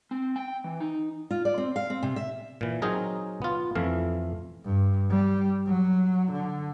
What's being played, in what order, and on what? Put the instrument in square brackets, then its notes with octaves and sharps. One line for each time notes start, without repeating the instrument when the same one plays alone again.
[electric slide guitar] C4
G5
E3
D#4
[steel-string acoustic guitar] F4
D5
C4
F5
C4
C3
E5
[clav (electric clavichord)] A#2 E3
F#3 C4 D#4 G#4 A#4
B3 F4
F2 E3 A3 F5
[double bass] G2
G3
F#3
D3